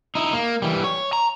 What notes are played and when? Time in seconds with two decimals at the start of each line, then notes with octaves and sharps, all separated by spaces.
0.15 D#4 E4
0.33 A#3
0.62 E3 G3
0.84 C#5
1.13 A#5